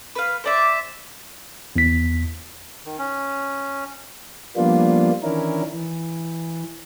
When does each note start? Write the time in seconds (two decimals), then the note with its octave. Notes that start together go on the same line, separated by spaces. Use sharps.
0.15 B4 F5
0.44 C5 D5 E5
1.76 E2 B6
2.86 D#3
2.98 C#4
4.56 F3 G3 A#3 B3 D4 F4
5.23 D#3 E3 C#4 D4 E4 A#4
5.72 E3